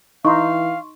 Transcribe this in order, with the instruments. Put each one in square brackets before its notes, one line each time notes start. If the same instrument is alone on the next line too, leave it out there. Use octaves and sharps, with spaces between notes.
[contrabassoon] E3 [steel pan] D#4 [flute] F5 [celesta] C6 C#6